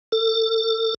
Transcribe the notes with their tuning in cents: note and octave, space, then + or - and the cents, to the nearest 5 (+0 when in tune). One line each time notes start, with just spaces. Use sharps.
A4 +35